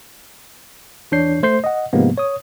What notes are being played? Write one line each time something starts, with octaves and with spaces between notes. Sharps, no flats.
E2 E3 D4 C#5 G6 C7
A3 C5 G6 C7
D#5 F#5
G#2 C3 F3 G#3 A#3 B3
C#5 D#6